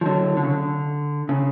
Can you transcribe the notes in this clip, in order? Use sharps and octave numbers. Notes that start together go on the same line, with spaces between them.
F3
D3 F#3
D3
C#3
D3
C#3